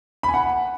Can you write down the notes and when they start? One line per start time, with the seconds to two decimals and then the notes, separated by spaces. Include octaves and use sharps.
0.23 B5
0.29 G#5
0.34 F#5